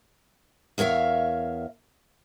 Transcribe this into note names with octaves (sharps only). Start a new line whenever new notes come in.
E2 A#4 C#5 E5 F5